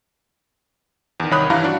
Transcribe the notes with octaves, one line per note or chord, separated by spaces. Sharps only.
E2 D#3
C2 D#3 C#5 B5 D#6 F#6
G2 E3 E4 F5 A#5
D4 F#4